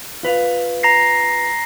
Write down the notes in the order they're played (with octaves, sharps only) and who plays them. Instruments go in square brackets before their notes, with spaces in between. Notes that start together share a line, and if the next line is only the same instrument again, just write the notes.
[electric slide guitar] F4 B4 F5
[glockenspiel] A#5 A#6 C7